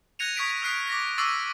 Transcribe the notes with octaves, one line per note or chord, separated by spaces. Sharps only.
F#6 G#6 A#6 C#7 D#7 F7
C#6 D#6 G#6 B6 D7 D#7
D#6 F6 F#6 B6 C7 D7
D6 A#6 B6
C#6 D6 E6 A6 C7 D#7